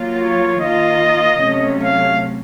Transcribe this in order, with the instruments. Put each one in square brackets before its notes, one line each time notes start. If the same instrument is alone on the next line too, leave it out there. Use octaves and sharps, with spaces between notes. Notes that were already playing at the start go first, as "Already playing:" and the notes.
Already playing: [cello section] F#3 A#3 F4
[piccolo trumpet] C#5
[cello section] D#3 A#3 F4 [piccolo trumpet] D#5
[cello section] C3 F#3 A3 C#4
[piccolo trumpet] F5